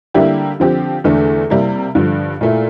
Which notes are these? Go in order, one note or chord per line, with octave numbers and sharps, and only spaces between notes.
D3 G3 A#3 E4 G4
D3 F3 C4 G4
E2 D3 A3 D4
C3 G3 A#3 E4
G2 D3 F3
A#2 A3 E4